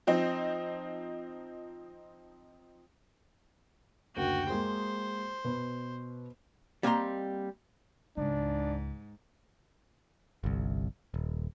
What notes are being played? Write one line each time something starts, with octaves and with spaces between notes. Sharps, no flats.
F3 C4 D#4
F#1 D2 F#4 G5
G#3 A#3 G#4 C5
B2 B4
G3 A#3 C4 D#5 A#5 C6
C#2 G#2 D4
G1 C2
D#1